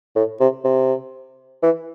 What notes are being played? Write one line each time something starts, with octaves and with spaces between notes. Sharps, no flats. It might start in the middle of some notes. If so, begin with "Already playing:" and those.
A2
C3
C3
E3